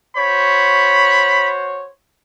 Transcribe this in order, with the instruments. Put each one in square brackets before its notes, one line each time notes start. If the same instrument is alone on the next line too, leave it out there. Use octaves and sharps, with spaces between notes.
[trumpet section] F#4 C5 C#5 [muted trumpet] B5